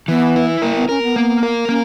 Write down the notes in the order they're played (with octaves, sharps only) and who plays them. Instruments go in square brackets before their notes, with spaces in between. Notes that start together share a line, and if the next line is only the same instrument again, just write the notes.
[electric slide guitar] E3 [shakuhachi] B3
[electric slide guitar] E4
[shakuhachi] A#3 [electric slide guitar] A#4
[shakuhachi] B3
[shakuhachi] C#4 [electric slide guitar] A#4
[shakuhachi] B3
[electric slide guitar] A#3
A#4
[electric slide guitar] A#3 [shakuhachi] C#4